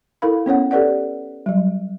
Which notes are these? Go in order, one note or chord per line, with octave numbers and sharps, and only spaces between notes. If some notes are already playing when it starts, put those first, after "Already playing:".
E4 A4 A#4 F5 B5
B3 C#4 C#5 F#5
G4 A4 B4 D5 F#5
F#3 G3